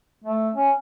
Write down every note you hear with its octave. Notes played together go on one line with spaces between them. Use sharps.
A3
C#4